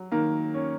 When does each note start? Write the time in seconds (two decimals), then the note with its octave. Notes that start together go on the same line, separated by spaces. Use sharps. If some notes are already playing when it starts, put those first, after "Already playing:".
Already playing: F#3
0.12 D#3 A#3
0.54 C#4